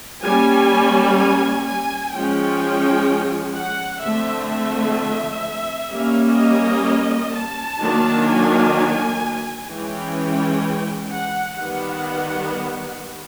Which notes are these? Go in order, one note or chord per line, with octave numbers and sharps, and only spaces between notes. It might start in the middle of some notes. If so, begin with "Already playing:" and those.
G3 A#3 C#4 G#5
G#5
G#5
F3 G#3 C#4 G5
F#5
D3 F3 A3 C4 E5
E5
G3 A#3 C#4
D#5
A5
D#3 F#3 A#3 D4
G#5
E3 G#3 C#4 G5
F#5
D#3 G3 B3 F#5